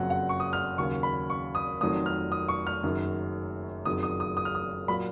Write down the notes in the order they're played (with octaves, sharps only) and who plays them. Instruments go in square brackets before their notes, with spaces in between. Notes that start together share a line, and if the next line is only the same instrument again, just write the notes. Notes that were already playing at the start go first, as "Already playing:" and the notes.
Already playing: [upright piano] F#1 F2 C#3 F#3 F#5
F#5
C#6
D#6
F6
D#2 C#3 F#3 C#6
B5
C#6
D#6
F1 F2 D#3 F#3 D#6
F6
D#6
C#6
F6
F#1 F#2 D#3 F#3
F#1 F2 D#3 F#3 D#6
D#6
D#6
D#6
F6
D#6
A#2 F#3 B5